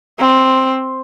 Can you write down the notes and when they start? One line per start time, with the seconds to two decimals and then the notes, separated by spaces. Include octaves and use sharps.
0.19 C4